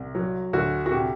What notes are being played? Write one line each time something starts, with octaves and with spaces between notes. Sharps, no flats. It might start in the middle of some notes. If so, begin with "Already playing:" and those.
Already playing: C2
F#3
D2 F#4
F#4
C3 G4